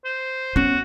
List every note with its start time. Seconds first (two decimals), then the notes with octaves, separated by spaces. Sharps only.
0.05 C5
0.56 B3 C#4 F#4